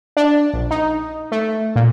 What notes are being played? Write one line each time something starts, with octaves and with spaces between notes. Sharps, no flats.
D4
A#1
D#4
A3
A#2